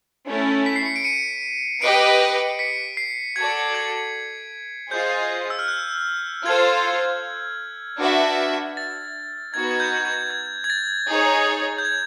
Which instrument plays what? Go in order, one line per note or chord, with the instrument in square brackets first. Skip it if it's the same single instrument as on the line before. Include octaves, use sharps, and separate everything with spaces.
[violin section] A3 C#4 E4
[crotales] B6
C7
C#7
D7
C#7 D#7
[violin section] G4 B4 D#5 [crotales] C7 D7
[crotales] B6 C#7
C7
[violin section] F#4 A4 D5 [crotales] G#6
[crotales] G#6
[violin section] F4 G#4 C5 D#5 [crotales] G6
[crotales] E6
F6
F#6
[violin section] F4 A4 C5 [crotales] G#6
[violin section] D4 F#4 B4 E5
[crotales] A6
[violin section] B3 D#4 F#4 B4 [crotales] G#6
[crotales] G#6
G6
G#6
G#6
G#6
A6
[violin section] D#4 G#4 C#5 [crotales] A6
[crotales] G6
G#6